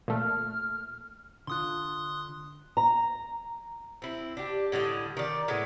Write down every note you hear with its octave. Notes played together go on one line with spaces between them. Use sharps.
A#2 A3 F6
D3 F4 C6 D#6 F#6
A#5
C4 E4
D4 G4
A2 D3 G3 D#5
D#3 D5
A2 G#3 B3